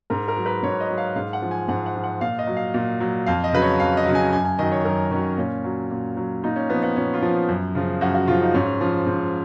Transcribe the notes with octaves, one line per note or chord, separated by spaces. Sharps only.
G#2 A#4
A#4
F#3
B4
G#2 C#5
D#5
F#3
F5
G#2 F5
F#5
F3
G#5
G#2 F#5
F#5
F3
F#5
A#2 F5
D#5
F#3
F5
A#2
F#3
F2 F5
D#5
C#3 F#3 B4
C#5
F2 F5
D#5
C#3 F#3
G#5
F#2 G#5
G#5
D#3 F#3 D#5
C#5
F#2 A#4
D#3 F#3 C#4
A#2 C#4
F#3
A#2
F#3
A#2 D#4
C#4
F3 B3
B3
A#2 C#4
F4
F3
F#2
C#3 F3
F#2 F#4
F#4
C#3 F3 F4
D#4
G#2 C#4
F3
G#2